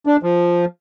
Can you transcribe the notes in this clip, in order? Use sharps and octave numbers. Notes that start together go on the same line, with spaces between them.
D4
F3